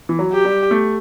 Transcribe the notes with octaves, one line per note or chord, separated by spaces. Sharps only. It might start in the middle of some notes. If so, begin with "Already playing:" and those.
E3
F#3
G4
G3
A3